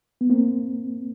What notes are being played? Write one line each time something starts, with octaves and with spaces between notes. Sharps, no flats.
B3
A#3 C4